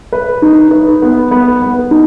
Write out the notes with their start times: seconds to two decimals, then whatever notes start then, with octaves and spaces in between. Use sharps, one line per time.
0.12 B4
0.42 D#4
0.71 B4
1.02 B3
1.31 B3
1.62 B3
1.91 D#4